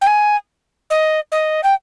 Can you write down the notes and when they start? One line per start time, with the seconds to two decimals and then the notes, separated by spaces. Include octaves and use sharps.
0.01 G5
0.07 G#5
0.90 D#5
1.32 D#5
1.63 G5